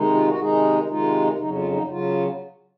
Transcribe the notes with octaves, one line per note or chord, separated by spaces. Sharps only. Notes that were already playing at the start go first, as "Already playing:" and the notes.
Already playing: C3 D#3 G#3 D#4
F4
F#4
C3 D#3 G#3 D#4 G#4
C3 D#3 G#3 D#4 F4
F2 C#3 F#3 D#4
F4
D#4
C#3 F#3 F4